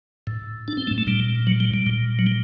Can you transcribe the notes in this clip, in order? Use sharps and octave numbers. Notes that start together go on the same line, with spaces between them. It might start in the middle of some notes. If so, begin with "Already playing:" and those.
A2
D4
C4
A3
A3
A#2 G3
F#3
G3
G3
A#2
F#3
G3